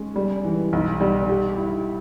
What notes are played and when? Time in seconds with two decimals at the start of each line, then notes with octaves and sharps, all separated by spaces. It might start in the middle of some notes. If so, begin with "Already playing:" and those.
Already playing: G#3 C#4
0.16 G3
0.45 E3
0.73 B1
1.00 G3
1.29 G4
1.57 E4